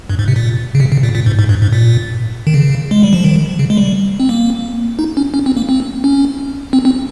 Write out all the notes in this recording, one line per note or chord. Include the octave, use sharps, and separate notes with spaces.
G2
G#2
C3
A#2
C#3
C3
C#3
A#2
A#2
G#2
G#2
G2
G#2
A#2
D#3
C#3
G#3
G3
F3
D#3
C#3
G#3
G3
C4
A#3
D#4
C#4
C#4
C4
A#3
C4
C#4
C4
C4